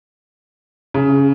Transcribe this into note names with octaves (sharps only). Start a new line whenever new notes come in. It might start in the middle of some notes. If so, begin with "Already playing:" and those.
C#3